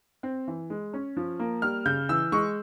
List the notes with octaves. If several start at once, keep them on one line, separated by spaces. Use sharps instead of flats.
C4
E3
G#3
C#4
F3
A#3
G3 F6
C#3 G6
E3 E6
G#3 C#6